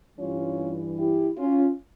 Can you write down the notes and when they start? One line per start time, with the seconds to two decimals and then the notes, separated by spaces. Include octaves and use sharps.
0.18 G2 E3 G3 C#4 F4
0.98 E4 G4
1.37 C#4 F4